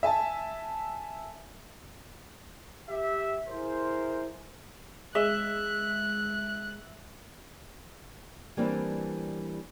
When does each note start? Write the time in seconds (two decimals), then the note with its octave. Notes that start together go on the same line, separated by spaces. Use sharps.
0.03 E5 G#5 A5
2.89 G4 E5
3.48 E4 G#4 A#4 C5
5.15 G#3 E5 F#6
8.57 E3 G3 A#3 C4 D4